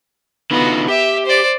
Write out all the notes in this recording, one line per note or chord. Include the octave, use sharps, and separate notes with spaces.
D3 B3 D#4 F4 F#4
G4 E5
C5 D5